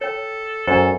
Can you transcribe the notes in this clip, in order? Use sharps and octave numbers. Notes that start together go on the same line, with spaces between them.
A4 C#5 G5
F#2 A4 C5 D5 G#5